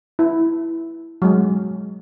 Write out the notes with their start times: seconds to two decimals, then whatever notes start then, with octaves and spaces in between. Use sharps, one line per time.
0.19 E4
1.22 F#3 G#3